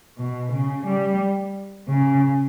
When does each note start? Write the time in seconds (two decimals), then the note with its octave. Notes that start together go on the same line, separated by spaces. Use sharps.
0.18 B2
0.53 C#3
0.87 G3
1.88 C#3